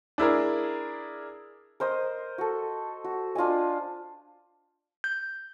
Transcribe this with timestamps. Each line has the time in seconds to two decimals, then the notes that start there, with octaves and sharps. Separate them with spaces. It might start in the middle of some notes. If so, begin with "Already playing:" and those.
0.18 D4 E4 G#4 A#4
1.80 A#4 C5 D#5 D#6
2.38 F#4 A4
3.04 F#4
3.35 D4 F4 D#5 G#5
5.04 G6